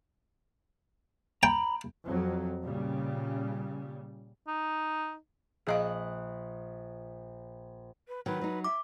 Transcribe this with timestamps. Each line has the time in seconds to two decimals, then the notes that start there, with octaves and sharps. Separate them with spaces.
1.43 G5 A#5 B5
2.05 F2 F#3
2.63 A#2 C#3 G3
4.47 D#4
5.67 A#1 G#4 D#5 F5 D#6 F#6
8.08 B4
8.26 D#3 F#3 B4
8.41 F#3 D#4
8.64 E5 D6